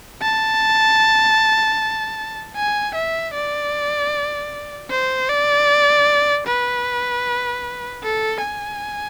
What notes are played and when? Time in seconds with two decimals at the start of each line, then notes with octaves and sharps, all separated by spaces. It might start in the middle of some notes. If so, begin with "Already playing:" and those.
0.22 A5
2.56 G#5
2.95 E5
3.34 D5
4.91 C5
5.29 D5
6.47 B4
8.03 A4
8.42 G#5